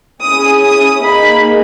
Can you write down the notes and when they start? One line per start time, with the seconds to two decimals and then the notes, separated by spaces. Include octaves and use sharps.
0.23 C#4 E4 G#4 D#6
0.63 D#6
1.03 A#3 D#4 G#4 B5